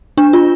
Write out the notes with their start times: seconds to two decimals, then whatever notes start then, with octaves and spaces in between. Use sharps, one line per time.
0.17 D4
0.33 F4